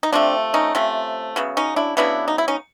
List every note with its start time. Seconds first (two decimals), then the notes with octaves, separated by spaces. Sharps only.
0.03 D#4
0.12 C3 F3 A3 C4 D4
0.54 C#4 D#4
0.75 C3 F3 A3
1.36 C#3 F#3 B3
1.57 C#4 D#4
1.76 D4 E4
1.97 C#3 F#3 B3 D4 E4
2.28 D#4
2.38 E4
2.48 C#4 D#4